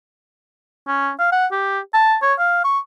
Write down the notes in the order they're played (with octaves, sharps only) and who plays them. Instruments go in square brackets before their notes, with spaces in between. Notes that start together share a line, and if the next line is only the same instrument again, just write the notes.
[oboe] C#4
F5
F#5
G4
A5
C#5
F5
C#6